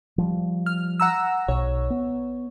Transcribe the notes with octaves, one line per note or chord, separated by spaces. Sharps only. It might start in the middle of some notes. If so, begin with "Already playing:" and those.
F3 G3
F6
F#5 A#5 E6
B1 C#5
B3